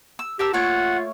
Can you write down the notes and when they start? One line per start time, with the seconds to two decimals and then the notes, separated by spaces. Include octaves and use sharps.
0.19 E6
0.39 G4 A#4 A5 E6
0.53 A3 A#3 F4 C#5 F#5